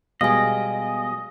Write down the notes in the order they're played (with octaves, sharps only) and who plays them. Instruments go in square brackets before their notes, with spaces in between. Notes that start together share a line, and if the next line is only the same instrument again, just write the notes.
[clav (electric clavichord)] B2 G3 G#3 [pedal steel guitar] D#5 [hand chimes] F5 G#5